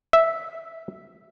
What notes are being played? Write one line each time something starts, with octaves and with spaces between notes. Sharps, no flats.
E5